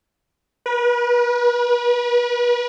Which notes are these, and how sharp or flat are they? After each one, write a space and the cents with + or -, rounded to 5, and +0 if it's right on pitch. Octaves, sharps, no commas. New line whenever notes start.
B4 -35